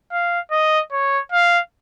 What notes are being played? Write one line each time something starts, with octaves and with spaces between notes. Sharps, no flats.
F5
D#5
C#5
F5